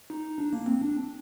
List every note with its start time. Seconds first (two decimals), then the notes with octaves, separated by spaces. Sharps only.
0.10 D#4
0.38 D4
0.53 A#3
0.66 C4
0.82 D4